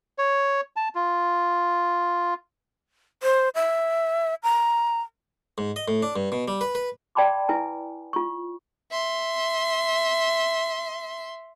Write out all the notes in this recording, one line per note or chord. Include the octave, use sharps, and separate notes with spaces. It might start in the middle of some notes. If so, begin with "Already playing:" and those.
C#5
A5
F4
C5
E5
A#5
G#2
D#5
A2
D4
G2
B2
G3
B4
B4
D5 G5 A5 B5 C6 D6
E4 B4 G#5
F4 C#6
E5 C6